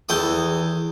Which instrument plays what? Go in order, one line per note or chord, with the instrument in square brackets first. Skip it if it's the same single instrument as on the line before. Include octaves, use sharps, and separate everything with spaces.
[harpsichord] E2 A4 G5 D#6